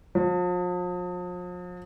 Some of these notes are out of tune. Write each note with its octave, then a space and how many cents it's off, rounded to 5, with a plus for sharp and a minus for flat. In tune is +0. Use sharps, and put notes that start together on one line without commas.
F3 +40